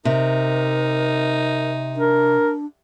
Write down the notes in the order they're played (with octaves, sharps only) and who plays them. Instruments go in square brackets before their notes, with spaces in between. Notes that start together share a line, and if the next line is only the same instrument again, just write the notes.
[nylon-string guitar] C3 [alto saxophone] D#4 [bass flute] A#4
[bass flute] D4 [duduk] A#4